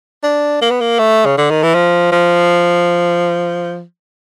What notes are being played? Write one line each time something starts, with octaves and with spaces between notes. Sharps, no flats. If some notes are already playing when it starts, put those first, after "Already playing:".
D4
A#3
B3
A#3
A3
C#3
D3
D#3
E3
F3
F3